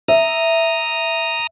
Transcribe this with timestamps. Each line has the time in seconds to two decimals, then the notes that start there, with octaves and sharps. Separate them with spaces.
0.08 E5 A#5 D#6